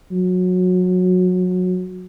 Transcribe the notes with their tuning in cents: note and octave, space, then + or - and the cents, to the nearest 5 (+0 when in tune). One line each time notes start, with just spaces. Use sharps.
F#3 -25